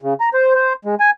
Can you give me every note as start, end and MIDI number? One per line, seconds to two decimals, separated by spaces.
0.02 0.14 49
0.20 0.29 82
0.34 0.53 72
0.55 0.73 72
0.85 0.95 56
1.00 1.10 80